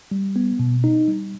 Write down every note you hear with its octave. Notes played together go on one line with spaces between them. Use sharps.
G3
B3
B2
D#4
G3